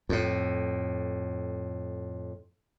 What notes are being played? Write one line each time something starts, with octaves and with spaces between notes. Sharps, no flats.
F2 A2